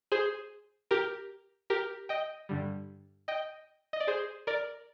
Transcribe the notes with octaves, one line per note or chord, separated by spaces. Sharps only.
G#4 C5
G4 A#4
G4 A#4
D#5 G5
G2 D3 G3
D#5 G5
D#5
D5
G#4 C5
A#4 D5